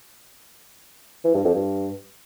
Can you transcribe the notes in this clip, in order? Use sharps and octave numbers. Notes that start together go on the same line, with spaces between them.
E3
G2
F2
G2